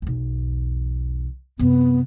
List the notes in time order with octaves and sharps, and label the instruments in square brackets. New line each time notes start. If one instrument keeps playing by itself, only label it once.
[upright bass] B1 E2
[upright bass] F#2 C3 [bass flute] B3